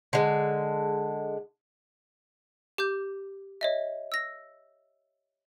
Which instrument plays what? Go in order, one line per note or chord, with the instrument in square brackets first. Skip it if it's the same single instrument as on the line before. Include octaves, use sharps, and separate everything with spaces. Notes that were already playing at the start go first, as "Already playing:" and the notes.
[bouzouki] D3 G#3
[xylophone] G4 D6 G6
C#5 D#5 E5
E6 A#6